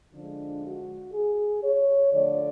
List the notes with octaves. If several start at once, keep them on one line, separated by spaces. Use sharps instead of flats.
D3 F3 G#3 D4
F#4
G#4
C#5
D3 F3 A3 D5